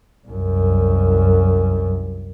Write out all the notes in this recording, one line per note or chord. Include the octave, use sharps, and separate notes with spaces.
C2 F#2